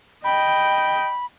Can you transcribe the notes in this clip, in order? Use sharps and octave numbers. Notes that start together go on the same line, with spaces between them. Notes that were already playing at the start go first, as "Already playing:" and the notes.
D#5 G5 B5